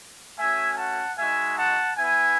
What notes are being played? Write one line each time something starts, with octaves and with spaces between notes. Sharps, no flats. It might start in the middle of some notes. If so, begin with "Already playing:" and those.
A3 C#4 F#4 E5 G#5
F#5 A5
G#3 D#4 F#4 E5 G#5
F#5 A5
B3 E4 E5 G#5